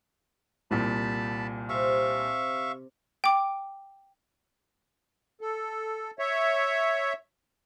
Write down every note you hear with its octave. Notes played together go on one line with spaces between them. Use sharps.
C2 A#2 A5 B5
C3 E5 F5 C#6
G5 D6
A4
C#5 E5